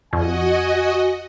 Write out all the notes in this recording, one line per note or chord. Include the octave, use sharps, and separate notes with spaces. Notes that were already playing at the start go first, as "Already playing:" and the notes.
F2 F#4 D#5 G#5